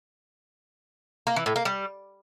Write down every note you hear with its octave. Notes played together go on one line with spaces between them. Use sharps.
A#3
E3
A2
A#3
G3